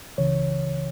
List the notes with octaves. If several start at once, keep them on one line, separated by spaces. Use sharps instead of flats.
C#2 C#3 E3 C#5